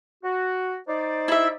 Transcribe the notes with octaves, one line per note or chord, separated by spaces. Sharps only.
F#4
D#4 C5 D5
E4 E5